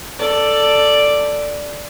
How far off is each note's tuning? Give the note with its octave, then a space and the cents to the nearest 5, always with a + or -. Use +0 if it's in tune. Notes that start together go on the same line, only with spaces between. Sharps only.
A4 +10 D5 +0